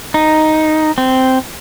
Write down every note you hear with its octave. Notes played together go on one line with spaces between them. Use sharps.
D#4
C4